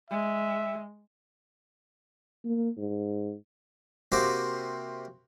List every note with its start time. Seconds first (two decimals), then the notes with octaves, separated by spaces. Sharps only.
0.10 G#3 E5
2.44 A#3
2.77 G#2
4.12 C3 A#3 F#4 C5 D6